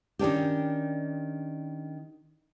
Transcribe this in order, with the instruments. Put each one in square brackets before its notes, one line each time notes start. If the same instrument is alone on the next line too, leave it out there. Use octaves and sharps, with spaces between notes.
[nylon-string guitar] D#3 C#4 D4 G4